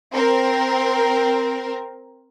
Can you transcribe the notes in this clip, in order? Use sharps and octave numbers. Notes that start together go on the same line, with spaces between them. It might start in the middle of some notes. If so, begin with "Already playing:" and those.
C4 A#4